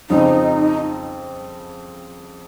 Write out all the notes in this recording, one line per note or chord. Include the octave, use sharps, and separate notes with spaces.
F2 C#3 F3 C4 D#4